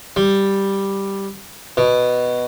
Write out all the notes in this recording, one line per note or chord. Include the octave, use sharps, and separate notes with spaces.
G3
B2